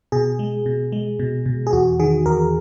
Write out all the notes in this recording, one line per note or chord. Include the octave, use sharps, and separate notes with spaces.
B2 G#4
G#3
B2
G#3
B2
B2
G#4
E2 F#4
D#3 G#4
E2 A#4